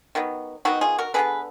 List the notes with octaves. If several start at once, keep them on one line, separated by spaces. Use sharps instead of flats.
D#3 F#3 B3
D#3 F#3 B3 D#4 F#4
F4 G#4
F#4 A#4
D3 G#3 B3 G#4 B4